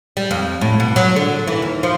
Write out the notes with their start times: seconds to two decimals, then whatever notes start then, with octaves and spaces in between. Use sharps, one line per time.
0.17 G3
0.31 F2
0.61 A2
0.80 B2
0.96 F#3
1.16 D3
1.47 E3
1.62 D#2
1.83 F3